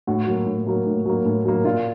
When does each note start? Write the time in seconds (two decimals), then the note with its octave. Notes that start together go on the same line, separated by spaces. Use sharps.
0.07 A2 F#4
0.27 F#3 A#3
0.46 A2
0.67 F#3 A#3
0.86 A2
1.06 F#3 A#3
1.25 A2
1.45 F#3 A#3
1.64 A#2 F4